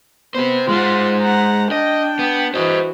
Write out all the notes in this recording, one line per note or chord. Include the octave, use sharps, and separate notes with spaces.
B3 G4 C5
G#3 F4 C5 F#5
F#5 A#5
D4 D#5 G5
B3
E3 F#4 C5 D#5